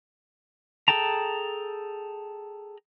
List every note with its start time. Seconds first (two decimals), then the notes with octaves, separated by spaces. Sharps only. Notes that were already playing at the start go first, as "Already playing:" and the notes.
0.88 G#4 A4 G5 A5 A#5